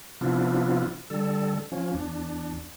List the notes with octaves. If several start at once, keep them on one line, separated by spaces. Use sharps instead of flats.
C3 F3 B3 D4 E4 F4
D3 G3 A4
F3 C#4
E2 D4